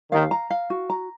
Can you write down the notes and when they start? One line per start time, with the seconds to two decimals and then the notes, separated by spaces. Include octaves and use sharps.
0.11 D#2 D#3 F5
0.31 A#5
0.50 F5
0.70 F#4
0.90 A#5